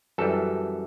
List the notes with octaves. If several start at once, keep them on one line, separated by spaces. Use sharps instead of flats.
F#2 E3 G3 A4